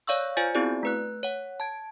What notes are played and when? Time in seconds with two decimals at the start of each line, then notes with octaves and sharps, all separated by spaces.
0.07 C#5 D5 F5 C#6 E6
0.37 F4 C5 D5 G#5 G6 A6
0.55 B3 C4 E4 F#4 G#4 D5
0.83 A3 B4 F#6
1.23 C#5 F#5
1.60 A5 G#6